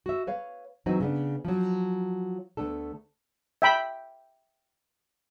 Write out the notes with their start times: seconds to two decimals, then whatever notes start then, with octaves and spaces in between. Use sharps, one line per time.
0.06 F#4 E5
0.27 B4 C#5 F5
0.86 E3 F#3 C4 D#4 F#4 B4
1.00 C#3 B3 D4
1.45 F3 F#3
2.57 D2 A3 B3 D4 A4
3.62 E5 G5 B5